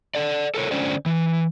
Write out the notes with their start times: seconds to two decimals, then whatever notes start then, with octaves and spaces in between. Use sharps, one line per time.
0.15 A4 D5
0.54 A4 A#4 C#5
0.71 D3 C#4 C5 D5
1.06 E3